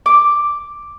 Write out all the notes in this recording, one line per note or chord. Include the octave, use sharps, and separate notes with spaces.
D6